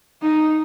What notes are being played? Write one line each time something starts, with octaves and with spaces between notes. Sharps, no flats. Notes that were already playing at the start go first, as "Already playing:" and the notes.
D#4